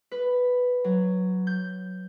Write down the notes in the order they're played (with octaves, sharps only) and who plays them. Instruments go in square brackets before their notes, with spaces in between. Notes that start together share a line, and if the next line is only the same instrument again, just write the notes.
[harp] B4
F#3
G6